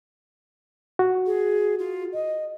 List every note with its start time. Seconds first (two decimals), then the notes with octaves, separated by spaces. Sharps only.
0.99 F#4
1.26 G#4
1.78 F4
2.13 D#5